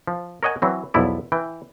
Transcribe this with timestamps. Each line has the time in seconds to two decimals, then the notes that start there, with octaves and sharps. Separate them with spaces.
0.07 F3
0.43 A#4 C#5 D#5 F#5 G#5
0.62 E3 F#3 C4
0.94 B1 E2 F3 E4 D5
1.32 E3 G5